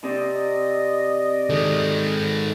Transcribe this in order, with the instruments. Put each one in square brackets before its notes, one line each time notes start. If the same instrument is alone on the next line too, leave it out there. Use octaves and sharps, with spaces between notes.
[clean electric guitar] C3 [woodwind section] D5 D#5
[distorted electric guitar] D#3 G#3 [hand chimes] A4